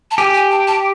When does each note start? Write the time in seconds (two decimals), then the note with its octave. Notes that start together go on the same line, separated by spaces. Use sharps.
0.11 A5
0.18 G4 G#5
0.34 G#5
0.51 A5
0.67 A5